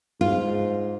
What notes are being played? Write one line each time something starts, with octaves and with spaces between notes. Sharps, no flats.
G#2 F4